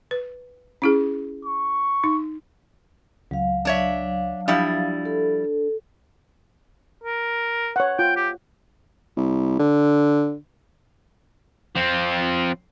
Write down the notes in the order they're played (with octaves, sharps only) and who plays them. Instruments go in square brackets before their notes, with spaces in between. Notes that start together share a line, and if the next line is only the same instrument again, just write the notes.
[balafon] B4
C#4 E4 G#4
[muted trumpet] C#6
[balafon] D#4
[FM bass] C#2 [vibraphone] F#3 F5
[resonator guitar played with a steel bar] D4 C#5 E5
[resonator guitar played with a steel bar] F3 G3 E4 [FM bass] D4
[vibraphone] A4
[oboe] A#4
[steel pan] C#5 F#5
[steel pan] F4 [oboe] G5
[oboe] G4
[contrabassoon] C2
D3
[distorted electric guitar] F3 C4